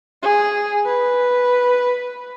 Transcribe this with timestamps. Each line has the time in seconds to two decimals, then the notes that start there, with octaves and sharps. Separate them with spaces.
0.22 G#4
0.86 B4